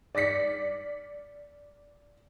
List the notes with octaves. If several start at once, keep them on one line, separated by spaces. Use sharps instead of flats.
D5 D6 A#6 B6 C#7